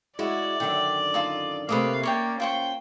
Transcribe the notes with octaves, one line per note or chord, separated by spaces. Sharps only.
G#3 E4 F#4 D5
F#2 D3 D#3 G5
D#4 F4 A4
C3 A3 A#3 B4 D#5 F5 D6
A#3 C#4 C#5 D5 G5
F4 C5 G5 C#6